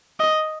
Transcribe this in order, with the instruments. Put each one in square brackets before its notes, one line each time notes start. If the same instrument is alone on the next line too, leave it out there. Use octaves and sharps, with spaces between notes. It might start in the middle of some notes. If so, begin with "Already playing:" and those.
[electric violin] D#5